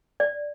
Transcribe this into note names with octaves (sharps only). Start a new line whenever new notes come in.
D5